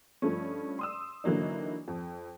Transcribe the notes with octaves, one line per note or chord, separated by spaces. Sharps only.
G2 F3 A3 C#4
C6 D#6 E6
D3 E3 F#3 A#3 D#4
F2